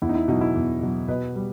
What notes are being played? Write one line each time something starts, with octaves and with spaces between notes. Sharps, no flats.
E2 E4
D#4
E4
B2 F#3 D#4
E4
E2
B2 F#3
B2 B4 D#5
G3